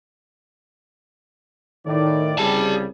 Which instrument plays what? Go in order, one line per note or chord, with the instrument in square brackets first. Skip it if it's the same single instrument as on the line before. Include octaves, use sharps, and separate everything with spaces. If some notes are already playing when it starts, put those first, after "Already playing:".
[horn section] A2 D5 [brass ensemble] D#3
[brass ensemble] C2 C#3 [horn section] G3 [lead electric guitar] G#4 A5